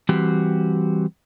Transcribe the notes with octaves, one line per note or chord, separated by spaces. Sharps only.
E3 G3 C4 F#4 G4